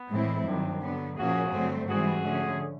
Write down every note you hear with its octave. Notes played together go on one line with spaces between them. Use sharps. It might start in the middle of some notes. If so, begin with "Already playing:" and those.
Already playing: B3
A2 E3 G#3 C4 E4
G2 D#3 F#3 C4 D4
D3 F#3 B3
A#2 F3 A#3 C#4 F#4 G#4
G2 D3 F#3 A3 C4
G#2 E3 G3 C4 F#4 G#4
D3 F3 A3 C#4